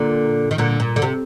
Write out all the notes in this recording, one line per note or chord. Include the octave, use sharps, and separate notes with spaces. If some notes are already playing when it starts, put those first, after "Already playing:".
Already playing: A#2 D3
D#3
A#2 D3
A#2
D3
C3